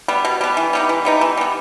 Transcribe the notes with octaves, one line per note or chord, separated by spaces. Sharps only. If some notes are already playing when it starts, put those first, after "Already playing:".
G3 B3
B2
G3 B3
E3
G3 B3 D#4
E3
G3 B3 D#4
E3
G3 B3